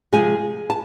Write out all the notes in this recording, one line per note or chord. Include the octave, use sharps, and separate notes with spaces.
C3 F3 G#3 G#4 G#5
A5